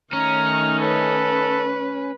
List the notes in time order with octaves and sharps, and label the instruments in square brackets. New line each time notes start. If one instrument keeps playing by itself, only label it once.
[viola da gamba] D#3 A3 D#4 [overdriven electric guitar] C#4 [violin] A#5 [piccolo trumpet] F6
[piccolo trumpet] A4 [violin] B4